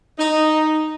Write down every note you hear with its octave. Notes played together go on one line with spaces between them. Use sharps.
D#4